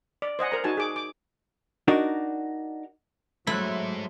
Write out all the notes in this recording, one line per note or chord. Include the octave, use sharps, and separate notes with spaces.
D5
C5 D#5 F#5 G#5
A#4 C5 A#5
D#4 F#4 G#5 A5
G#4 D6
D6
D4 D#4 F#4 A#4 D5
F#3 G#3 A3 E4 C5 F#6